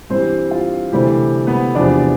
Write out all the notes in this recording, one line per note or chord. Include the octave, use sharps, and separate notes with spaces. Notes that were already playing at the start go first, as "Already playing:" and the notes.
G2 E3 G3 C4 C5
F4
D2 C3 E3 G3 A3 C4 G4
B3 B4
E2 C3 F3 B3 D4 D5